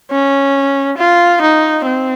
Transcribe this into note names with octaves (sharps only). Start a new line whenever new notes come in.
C#4
F4
D#4
C4